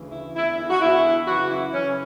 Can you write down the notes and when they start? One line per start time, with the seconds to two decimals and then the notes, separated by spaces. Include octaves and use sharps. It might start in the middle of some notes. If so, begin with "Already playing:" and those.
Already playing: D2 C#3 E3
0.12 E4
0.35 E2 D3 E4
0.58 E4
0.70 F#4
0.81 E2 D3 E4
1.27 F#2 C#3 E3 F#4
1.51 E4
1.73 F#2 C#3 E3 C#4